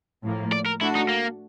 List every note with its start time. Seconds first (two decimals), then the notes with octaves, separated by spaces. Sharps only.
0.23 A2 F3 A#3
0.52 D5
0.66 A#4
0.81 A3 D4 E4 F#4
0.95 D#4
1.09 A#3